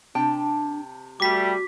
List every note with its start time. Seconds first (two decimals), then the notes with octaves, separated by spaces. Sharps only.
0.15 C3 D4 G5 A5
1.20 G3 A3 F#4 D6 B6